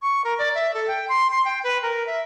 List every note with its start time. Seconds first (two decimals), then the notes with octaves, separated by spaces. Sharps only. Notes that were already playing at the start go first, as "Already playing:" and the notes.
0.02 C#6
0.24 A#4
0.38 D5
0.55 E5
0.74 A4
0.88 G5
1.09 C6
1.31 C6
1.45 G5
1.64 B4
1.83 A#4
2.06 E5